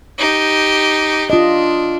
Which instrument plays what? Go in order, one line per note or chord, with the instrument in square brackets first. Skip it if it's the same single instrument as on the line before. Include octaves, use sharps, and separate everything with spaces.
[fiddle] D#4 G4
[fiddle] D4 [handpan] F4 D#5